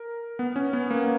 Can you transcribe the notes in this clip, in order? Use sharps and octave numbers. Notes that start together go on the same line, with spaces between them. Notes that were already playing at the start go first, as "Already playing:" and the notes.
Already playing: A#4
B3
C#4
B3
A#3